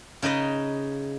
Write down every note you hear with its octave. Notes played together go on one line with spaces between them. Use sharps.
C#3 D#4 B4 D#5